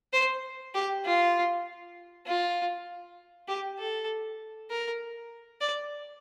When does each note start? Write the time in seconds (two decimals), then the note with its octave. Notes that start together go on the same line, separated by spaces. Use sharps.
0.13 C5
0.74 G4
1.05 F4
2.26 F4
3.48 G4
3.79 A4
4.70 A#4
5.61 D5